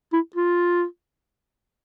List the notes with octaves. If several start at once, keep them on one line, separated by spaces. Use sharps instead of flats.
E4
F4